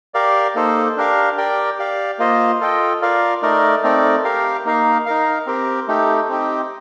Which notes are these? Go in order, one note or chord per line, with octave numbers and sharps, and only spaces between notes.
G4 A#4 D5 F5
A#3 D#4 A4 C5
D4 G4 A#4 F5
G4 A#4 D5 G5
G4 D5 F5
A#3 F4 C5 D#5
F4 A4 D#5 G5
F4 A#4 D5 F5
A3 D#4 A#4 D5
A3 C4 D#4 A#4 D5
G4 A#4 F5
A#3 D#4 A#4 F5
D#4 A#4 F5
C4 G4 A#4
A3 D#4 G4
C4 D#4 G4